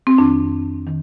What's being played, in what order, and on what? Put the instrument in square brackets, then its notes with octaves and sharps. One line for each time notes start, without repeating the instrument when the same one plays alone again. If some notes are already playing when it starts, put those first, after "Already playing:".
[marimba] C4
F2 D#3 D4
D#3